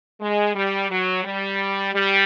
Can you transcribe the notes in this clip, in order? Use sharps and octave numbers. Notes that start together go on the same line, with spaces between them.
G#3
G3
F#3
G3
G3